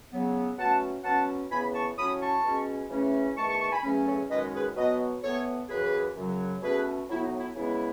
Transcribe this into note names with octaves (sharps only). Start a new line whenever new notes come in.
C#3 F#3 B3
B2 F#3 A3 C#4 F#5 A5
B2 F#3 C#4 F#5 A5
C#3 E3 B3 G#5 B5
A5 C#6
A2 F#3 C#4 B5 D#6
A5 C#6
B2 G#3 C#4
C#3 E3 A3 C#4
E2 D#3 A3 A5 C#6
A5 C#6
A5 C#6
G#5 B5
E2 C#3 F#3 A3 C#4
A4 C#5
F#2 D#3 G#3 C#4 B4 D#5
G#4 B4
B2 F#3 B3 B4 D#5
A2 E3 B3 A4 C#5
F#2 C#3 E3 G#4 B4
F#2 C#3 F#3
B2 A3 C#4 G#4 B4
A2 F#3 B3 E4
D#4
E4
C#3 E3 G#3 B3 E4